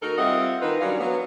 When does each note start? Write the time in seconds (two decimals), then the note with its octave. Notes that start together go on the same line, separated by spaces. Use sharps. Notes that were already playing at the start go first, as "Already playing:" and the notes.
0.02 D#2 D#4 F#4 A4 A#4
0.18 G3 C4 F4 D#5 E5 F#5
0.62 D#3 E3 D#4 F4 A#4 B4
0.81 F#2 F#3 G3 C#4 D4 F5
1.00 F#3 B3